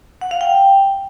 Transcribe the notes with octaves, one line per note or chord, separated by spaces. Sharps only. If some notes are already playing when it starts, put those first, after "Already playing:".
F#5
F5
G5